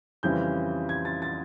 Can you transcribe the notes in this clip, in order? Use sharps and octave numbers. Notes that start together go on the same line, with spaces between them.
F2 C#3 E3 G3 C4 G6
G#6
A6
A6